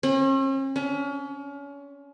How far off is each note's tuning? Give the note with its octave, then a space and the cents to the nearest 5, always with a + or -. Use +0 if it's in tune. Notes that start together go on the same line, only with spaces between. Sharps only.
C#4 -45
C#4 +35